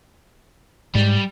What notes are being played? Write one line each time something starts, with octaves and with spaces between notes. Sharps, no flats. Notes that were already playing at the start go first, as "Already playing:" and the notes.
G#2 G3 G#3